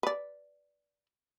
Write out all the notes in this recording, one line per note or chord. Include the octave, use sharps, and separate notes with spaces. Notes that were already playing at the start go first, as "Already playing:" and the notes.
B4 D5